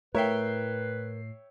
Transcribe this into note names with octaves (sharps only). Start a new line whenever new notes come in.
A2 A#4 B4 C#5 E5 G5 C7